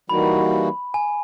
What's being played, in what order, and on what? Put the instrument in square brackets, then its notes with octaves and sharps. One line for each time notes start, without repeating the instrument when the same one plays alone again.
[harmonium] E3 G3 A#3 D#4 F#4 [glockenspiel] B5
[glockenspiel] G#5